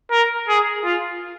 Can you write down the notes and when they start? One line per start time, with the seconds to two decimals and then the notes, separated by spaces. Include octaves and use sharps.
0.11 A#4
0.48 G#4
0.84 F4